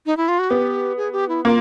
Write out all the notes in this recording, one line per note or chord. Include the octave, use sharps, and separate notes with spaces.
D#4
E4
F4
F#4
B3 G4
G#4
G4
E4
A#3 F4